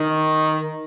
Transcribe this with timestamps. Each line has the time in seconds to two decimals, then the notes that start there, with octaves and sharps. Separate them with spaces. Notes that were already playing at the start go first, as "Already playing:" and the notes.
Already playing: D#3